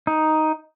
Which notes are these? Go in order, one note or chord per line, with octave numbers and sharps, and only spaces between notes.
D#4